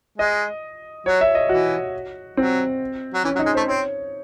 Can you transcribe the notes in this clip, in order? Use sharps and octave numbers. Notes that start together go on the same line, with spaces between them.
G#3 D#5
F#3 C#5
E5
D#5
E3 F#4
F#3 C4
F#3
E3 C#4
F#3
D#4
G#3
A3 C5
C4 C#5